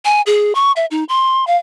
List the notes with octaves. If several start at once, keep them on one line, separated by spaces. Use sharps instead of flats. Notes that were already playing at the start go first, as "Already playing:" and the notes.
G#5
G#4
C#6
E5
D#4
C6
F5